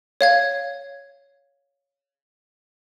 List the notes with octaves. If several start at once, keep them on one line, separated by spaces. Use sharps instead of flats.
C#5 F5 G#6